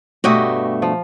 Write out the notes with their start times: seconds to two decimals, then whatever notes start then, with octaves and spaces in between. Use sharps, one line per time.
0.24 G2 B2 A3 F#4 G4 D#5
0.82 F3